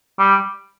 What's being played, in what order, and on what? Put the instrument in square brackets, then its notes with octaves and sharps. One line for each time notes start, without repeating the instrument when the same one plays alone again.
[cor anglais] G3